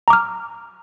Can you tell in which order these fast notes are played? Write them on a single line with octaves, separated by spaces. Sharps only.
A#5 D6 F6